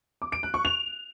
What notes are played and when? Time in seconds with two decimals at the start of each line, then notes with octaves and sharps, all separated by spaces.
0.22 D6
0.32 D7
0.43 F#6
0.54 C#6
0.65 F7